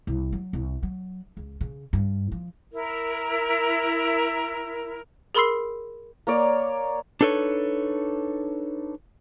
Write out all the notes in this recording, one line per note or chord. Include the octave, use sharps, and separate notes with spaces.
C2
F#3
C2
F#3
C#2
C#3
G2
F3
E4 A#4
G#4 A#4 B5 C6 E6 C7
A#3 C#5 D5
D4 D#4 A4 B4 C#5